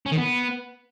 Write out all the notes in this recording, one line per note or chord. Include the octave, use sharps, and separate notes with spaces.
C#4
D#3
B3